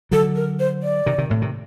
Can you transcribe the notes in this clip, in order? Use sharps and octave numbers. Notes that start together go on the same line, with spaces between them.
D3 F#3 A4
A#4
C5
D5
C3 D#3
C3 D#3
A2 C3
C3 D#3